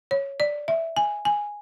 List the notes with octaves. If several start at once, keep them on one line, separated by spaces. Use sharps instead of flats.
C#5
D5
E5
G#5
G#5